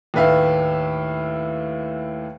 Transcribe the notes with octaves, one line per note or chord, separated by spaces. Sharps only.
D#2 A2 B4 E5 F5